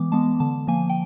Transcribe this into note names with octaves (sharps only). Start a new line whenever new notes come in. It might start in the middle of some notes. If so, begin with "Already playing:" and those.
Already playing: E3 G#3 B3 D6
G#3 B3 A5
D3 A5
F3 A#3 G#5
G5